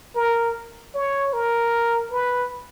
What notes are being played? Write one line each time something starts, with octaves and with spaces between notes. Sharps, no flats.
A#4
C#5
A#4
B4